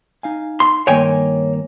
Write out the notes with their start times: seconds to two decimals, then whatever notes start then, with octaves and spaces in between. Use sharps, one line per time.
0.23 D#4 F5 G#5
0.60 C6
0.87 G2 D#3 A#3 C#5 G5 G#5